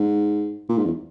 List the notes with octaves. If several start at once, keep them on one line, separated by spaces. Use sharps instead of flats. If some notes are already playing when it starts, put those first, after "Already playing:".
Already playing: G#2
A#2
G#2
E2